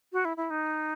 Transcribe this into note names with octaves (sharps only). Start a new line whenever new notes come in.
F#4
E4
E4
D#4